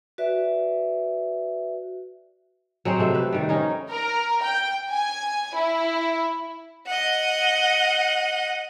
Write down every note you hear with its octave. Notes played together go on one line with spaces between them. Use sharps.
F#4 B4 D5 E5
F#3 G#3 C4 C5
C3 A3
B4
C3 D#3 G3
C#4 D#4
A#4
G5
G#5
E4
D#5 F#5